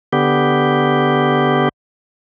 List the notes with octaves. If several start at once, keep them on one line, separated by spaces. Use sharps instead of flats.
D3 B3 G4